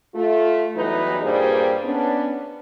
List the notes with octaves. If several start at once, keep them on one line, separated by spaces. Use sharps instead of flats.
A3 F4
E2 E3 F#3 G3 D#4 B4
G2 A#2 G3 A#3 G#4 C5
B3 C#4 D4